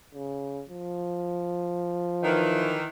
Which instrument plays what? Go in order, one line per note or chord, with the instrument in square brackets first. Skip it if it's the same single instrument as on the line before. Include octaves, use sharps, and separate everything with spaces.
[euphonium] C#3
F3
[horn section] D#3 E3